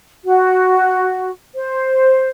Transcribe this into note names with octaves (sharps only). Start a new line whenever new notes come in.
F#4
C5